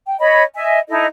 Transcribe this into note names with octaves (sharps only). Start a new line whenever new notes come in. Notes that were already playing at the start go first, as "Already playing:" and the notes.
G5
C#5 D#5 B5
D#5 E5 G#5
D#4 E4 A4 D#5